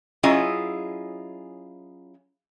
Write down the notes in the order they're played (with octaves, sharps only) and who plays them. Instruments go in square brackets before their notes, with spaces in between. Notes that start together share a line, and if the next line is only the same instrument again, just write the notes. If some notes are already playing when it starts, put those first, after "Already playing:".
[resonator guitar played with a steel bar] F#3 C#4 E4 F4 G#4 D#5